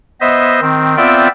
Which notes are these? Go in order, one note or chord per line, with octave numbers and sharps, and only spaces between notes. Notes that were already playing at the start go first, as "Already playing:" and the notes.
B3 C5 D#5 E5
D#3 C4
B3 C4 F4 D5 E5 G5